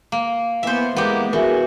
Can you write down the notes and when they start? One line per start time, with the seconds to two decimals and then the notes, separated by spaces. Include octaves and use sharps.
0.12 A#3
0.63 E3 A#3 B3 C5 E5
0.96 E3 G#3 A#3 B3 G4
1.33 E3 F#4 G#4 A#4 E5